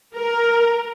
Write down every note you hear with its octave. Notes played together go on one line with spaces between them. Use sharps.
A#4